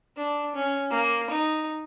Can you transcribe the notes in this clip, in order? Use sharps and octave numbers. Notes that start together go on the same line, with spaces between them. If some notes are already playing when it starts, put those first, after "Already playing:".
D4
C#4
A#3
D#4